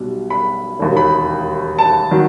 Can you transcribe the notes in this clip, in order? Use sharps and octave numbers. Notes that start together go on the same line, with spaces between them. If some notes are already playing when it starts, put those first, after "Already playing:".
Already playing: B1 B2 G3
B5
E1 D#2 D#3
B5
A5
D#3 F#3